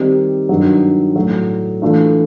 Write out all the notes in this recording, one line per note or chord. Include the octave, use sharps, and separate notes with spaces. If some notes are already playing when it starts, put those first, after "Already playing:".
Already playing: D#3 G3 C4 D#4
G2 D#3 F#3
A2 F#3 A3
E3 A3 D4 F4